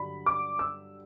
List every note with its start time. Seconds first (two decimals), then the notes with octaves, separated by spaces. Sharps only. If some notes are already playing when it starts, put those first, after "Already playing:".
Already playing: G2 D3 F#3 B5
0.26 D6
0.59 E6